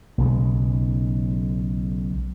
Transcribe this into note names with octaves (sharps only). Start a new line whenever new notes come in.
B1 C#3 G#3